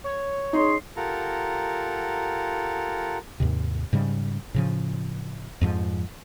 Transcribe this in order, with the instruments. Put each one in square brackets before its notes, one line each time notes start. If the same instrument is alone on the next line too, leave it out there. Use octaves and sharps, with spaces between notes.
[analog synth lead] C#5
[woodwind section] C#4 G#4 C6 [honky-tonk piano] D#4
[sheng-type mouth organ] F4 G4 A4 A#4 F#5 A#5
[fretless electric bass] D#2 G#2 C3
G#2 C#3 G3
A2 C#3 F3
F2 G#2 F3